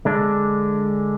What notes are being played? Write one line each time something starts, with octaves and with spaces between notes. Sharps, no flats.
D3 G#3 D4